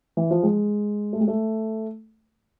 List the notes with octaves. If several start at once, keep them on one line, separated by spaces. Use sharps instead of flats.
E3
F3
G#3
A3
G#3
A3